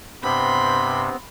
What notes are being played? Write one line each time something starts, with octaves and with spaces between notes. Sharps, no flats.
G2 C3 B3 C4 B5 C6